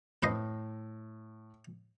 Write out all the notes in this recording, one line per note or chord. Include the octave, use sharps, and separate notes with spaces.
A2 B4 C5 D#5